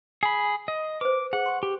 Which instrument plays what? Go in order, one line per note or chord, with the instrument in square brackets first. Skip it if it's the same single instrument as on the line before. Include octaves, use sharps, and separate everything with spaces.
[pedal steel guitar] G#4 B5 [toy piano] G#5
[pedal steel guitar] D#5
[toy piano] B4 C5 [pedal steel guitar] D6
[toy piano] G#4 [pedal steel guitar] F#5
[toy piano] C6 C#6
[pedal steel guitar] G4